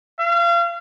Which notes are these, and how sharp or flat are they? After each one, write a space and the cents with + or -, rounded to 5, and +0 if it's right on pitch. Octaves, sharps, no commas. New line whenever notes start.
F5 -35